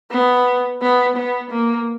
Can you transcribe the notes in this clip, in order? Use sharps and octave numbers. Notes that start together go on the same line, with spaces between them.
B3
B3
B3
A#3